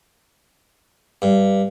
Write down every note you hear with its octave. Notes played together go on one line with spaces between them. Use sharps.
G2